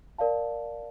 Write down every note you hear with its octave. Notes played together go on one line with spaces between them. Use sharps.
A#4 D5 F5 A5